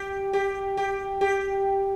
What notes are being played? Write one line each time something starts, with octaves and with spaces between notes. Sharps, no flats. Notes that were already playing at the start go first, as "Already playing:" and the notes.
Already playing: G4
G4
G4
G4